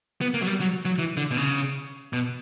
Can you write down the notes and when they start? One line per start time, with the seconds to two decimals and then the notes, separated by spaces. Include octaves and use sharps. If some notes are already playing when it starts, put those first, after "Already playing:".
0.21 B3
0.34 A#3
0.41 F#3
0.47 G3
0.60 F#3
0.85 F#3
0.98 E3
1.17 D3
1.31 B2
1.37 C#3
2.13 B2